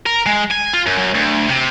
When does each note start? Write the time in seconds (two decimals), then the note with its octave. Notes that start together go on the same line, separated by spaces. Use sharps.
0.06 A#4
0.26 G#3
0.51 G#5
0.73 F4
0.86 F#2
0.98 F#2
1.14 D2
1.48 C3